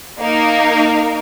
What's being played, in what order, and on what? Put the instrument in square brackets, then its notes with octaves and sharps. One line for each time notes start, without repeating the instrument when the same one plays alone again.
[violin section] A#3 D#4 A#4